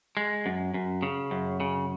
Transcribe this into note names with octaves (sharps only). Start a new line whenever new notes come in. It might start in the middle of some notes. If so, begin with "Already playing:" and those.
G#3
F#2
F#2
C#3
F#2
C#3